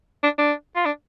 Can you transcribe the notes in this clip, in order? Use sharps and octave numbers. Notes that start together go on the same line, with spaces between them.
D4
D4
F4
D4